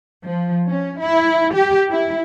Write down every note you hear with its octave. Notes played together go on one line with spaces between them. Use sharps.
F3
C#4
E4
G4
E4